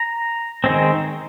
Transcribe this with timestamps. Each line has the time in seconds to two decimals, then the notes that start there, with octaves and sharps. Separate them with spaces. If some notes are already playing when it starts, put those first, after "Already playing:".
Already playing: A#5
0.64 D#3 G#3 C4